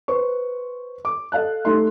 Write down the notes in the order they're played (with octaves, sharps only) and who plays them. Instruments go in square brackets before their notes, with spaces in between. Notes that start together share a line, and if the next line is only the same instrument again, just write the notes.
[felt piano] B4 C5 C#6
D6
A4 D#5 F5 A5 F#6
G3 A3 D#4 A4 E5 C6